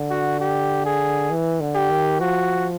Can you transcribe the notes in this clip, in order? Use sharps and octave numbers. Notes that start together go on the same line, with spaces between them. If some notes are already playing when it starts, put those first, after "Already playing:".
Already playing: D3
F#4
G4
G#4
E3
D3
G4
D#3
F3 F#4